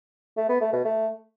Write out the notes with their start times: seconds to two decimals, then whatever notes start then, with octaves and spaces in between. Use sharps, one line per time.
0.37 A3
0.49 B3
0.61 A3
0.73 B2
0.85 A3